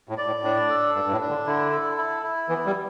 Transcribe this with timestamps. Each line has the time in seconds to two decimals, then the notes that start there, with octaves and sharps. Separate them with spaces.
0.09 A2
0.18 D5
0.26 A2
0.43 A2 D4
0.69 A4
0.95 G2 D4
1.06 G2
1.12 A2
1.21 D4
1.29 D3
1.46 D3 E4
1.71 A4
1.97 E4
2.23 E4
2.49 E3 B3
2.66 G3